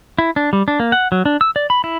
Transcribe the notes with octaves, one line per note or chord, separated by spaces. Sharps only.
E4
D4
G3
D4
A#3
F#5
F#3
D4
E6
D5
B5
E4